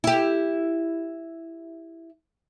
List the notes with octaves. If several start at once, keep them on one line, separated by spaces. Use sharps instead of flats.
E4 G4